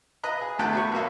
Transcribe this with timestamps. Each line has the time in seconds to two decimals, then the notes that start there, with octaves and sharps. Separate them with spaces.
0.23 B4 D#5 A#5 F#6
0.41 G#4
0.59 A1 E2 D3 A3 F#5 G5
0.73 F#4 B4 C#5
0.92 B1 B2 A#3 E5